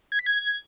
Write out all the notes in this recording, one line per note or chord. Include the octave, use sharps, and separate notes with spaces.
G#6
B6
G#6